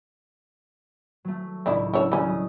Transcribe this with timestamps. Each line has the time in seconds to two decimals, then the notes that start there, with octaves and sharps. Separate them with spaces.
1.25 F#3 A3
1.66 C#2 A2 D#3 D4 E4
1.93 C#4 D4 C#5 E6
2.12 D2 G3 C#4 D4
2.25 F#3 D#5 D#6